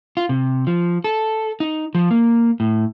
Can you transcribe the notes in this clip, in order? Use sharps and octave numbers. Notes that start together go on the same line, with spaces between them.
F4
C3
F3
A4
D#4
F3
A#3
A2